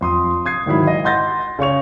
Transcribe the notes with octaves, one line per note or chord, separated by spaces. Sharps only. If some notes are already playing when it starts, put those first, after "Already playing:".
F2 C6 D#6
D#6 G#6 C7
G#2 D#3 F#3 E4 B5
D#5
F#5 C6 G6 A6 A#6
C#3 C#5 C#6 F7